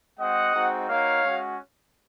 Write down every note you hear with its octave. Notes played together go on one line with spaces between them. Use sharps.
G#3 C4 F#4 D#5 F#5
G#3 C4 D#4 F#4
A#3 D#4 F#4 C#5 F5
G#3 C#4 F#4